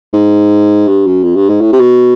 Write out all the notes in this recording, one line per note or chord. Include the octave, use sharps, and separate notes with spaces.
G#2
G2
F#2
F2
G2
G#2
A2
C3
B2